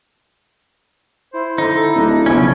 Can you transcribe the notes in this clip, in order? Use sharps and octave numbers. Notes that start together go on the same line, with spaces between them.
E4 C5
D3 D#4
A4
D1 D4
B1 C#3 F3 C#4